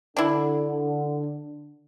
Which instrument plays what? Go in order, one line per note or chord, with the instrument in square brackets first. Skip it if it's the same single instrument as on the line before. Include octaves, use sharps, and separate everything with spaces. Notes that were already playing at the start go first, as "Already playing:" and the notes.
[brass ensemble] D3 [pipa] D4 E4